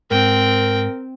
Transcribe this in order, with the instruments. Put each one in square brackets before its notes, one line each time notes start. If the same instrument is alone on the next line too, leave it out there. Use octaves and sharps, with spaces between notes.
[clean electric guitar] G#2 [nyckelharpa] C4 G5 [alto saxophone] A#4